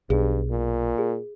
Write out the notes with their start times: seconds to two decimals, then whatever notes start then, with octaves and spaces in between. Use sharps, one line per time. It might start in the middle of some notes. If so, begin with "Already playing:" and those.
0.10 B1 G2 G#4
0.50 A#2
0.98 G#4